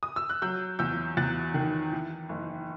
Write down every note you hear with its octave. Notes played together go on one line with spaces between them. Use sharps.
D#6
E6
F#6
F#3 E6 G6
E2 E6 G6
E2 F#6 A6
D#3
E3
F#1